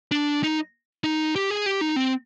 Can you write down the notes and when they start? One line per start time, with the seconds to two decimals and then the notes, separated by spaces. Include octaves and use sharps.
0.11 D4
0.43 D#4
1.04 D#4
1.36 G4
1.50 G#4
1.66 G4
1.81 D#4
1.96 C4